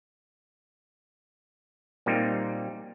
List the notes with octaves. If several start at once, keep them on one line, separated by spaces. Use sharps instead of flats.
A#2 G3 A#3 C4 D#4